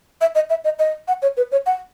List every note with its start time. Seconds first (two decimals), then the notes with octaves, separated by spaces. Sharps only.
0.21 E5
0.35 D#5
0.50 E5
0.64 D#5
0.79 D#5
1.08 F#5
1.22 C#5
1.37 B4
1.52 C#5
1.66 F#5